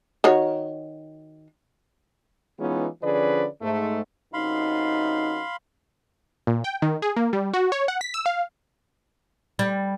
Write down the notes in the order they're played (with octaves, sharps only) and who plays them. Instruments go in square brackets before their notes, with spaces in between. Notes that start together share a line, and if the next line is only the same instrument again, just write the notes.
[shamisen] D#3 F#4 C#5
[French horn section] E3 G#3 B3 C#4 D#4 F4
D3 F3 C#4 G#4 B4 D5
G#2 A3
[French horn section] F#2 C3 D#4 [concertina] F5 B5 C6
[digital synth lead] A#2
G5
D#3
G#4
A#3
G3
F#4
C#5
F#5
B6
E6
F5
[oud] G3